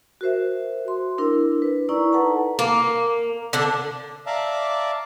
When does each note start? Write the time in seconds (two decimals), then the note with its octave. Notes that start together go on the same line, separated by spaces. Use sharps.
0.21 F#4 A#4 C5 E5
0.88 C6
1.18 D4 E4 A#4
1.62 B4
1.89 D#4 E4 D5 A#5 C#6
2.13 A4 B4 F#5 A5 A#5
2.59 A#3
3.53 D3 D4
4.26 D5 E5 F5 A5 A#5 D6